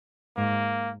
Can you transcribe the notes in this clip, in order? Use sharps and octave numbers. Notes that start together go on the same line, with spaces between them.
G#2 A#3